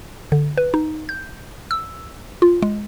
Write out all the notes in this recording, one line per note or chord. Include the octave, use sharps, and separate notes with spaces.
D3
B4
D#4
G6
E6
F4
G#3